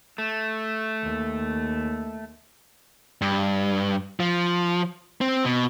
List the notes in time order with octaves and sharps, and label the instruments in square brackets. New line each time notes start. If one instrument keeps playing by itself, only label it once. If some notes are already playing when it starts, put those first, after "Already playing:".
[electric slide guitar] A3
[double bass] D#2
[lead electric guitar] G2
F3
C4
B2